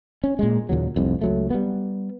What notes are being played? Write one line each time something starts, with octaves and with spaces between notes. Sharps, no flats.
C#4
A#2 G#3
D#2 A#2 C#3 F#3
F1 C2 F2
C#2 F#3 A3
G3 B3